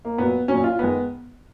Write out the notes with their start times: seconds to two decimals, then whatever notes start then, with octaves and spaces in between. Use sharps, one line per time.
0.05 A#3
0.18 A#2 F#3 B3
0.48 A#2 F#3 C#4
0.64 F4
0.79 D#3 G#3 B3